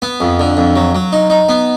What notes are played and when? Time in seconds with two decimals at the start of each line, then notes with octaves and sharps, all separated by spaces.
0.02 B3
0.20 F2
0.40 D3
0.57 F2
0.76 F#3
0.95 F#3
1.13 D#4
1.30 D#4
1.49 B3